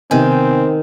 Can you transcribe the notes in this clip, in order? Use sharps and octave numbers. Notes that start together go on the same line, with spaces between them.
C3 D#3 B3 C4 G#5